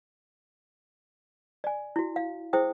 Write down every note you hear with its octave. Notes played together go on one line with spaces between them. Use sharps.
D5 G#5
E4 F#4
F5
E4 G#4 C5 G5 D#6